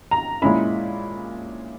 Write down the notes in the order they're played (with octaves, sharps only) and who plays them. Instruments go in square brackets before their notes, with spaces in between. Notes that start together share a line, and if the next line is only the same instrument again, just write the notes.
[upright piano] A#5
A#2 G#3 C#4 E4 B5